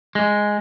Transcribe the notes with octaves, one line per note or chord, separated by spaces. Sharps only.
G#3